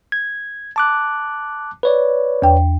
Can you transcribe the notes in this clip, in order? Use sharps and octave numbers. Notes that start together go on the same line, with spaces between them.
G#6
A5 D6 F#6
B4 C#5 D5
E2 G5